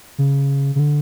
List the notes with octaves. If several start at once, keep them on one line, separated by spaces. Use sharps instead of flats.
C#3
C#3
D3